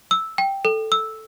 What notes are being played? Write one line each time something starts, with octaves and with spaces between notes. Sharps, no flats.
E6
G5
A4
E6